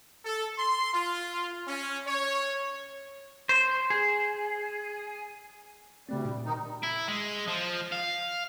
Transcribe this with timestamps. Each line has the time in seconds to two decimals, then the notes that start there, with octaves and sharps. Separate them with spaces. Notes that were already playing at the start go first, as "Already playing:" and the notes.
0.25 A4
0.58 C6
0.94 F4
1.67 C#4
2.07 C#5
3.49 C5
3.90 G#4
6.09 D2 C#3 G3 A3 C4
6.25 A#2
6.46 D#3 D#4
6.83 E4
7.08 G#3
7.48 F3
7.92 F5